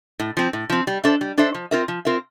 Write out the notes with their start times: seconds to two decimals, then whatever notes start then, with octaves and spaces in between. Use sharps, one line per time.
0.20 A2
0.37 F3 C4
0.53 A2
0.70 F3 C4
0.87 G3
1.04 D4 A4 C5 E5
1.21 G3
1.38 D4 A4 C5 E5
1.55 F3
1.71 C4 F4 A#4 E5
1.88 F3
2.05 C4 F4 A#4 E5